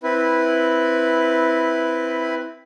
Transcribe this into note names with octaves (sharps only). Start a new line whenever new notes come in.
C4 E4 B4